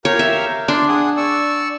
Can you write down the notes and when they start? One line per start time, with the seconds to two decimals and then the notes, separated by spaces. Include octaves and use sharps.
0.05 G4 A#4 C#5 F5
0.19 E5
0.68 D4 D5 C6
0.88 G#4 F#5 D#6
1.17 D5 C#6 E6